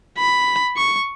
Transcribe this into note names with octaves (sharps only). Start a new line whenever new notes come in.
B5
C#6